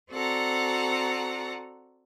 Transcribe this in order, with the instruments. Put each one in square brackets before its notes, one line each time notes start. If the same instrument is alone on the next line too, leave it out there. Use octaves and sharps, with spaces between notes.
[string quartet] C4 F#4 A4 D5 F#5 A#5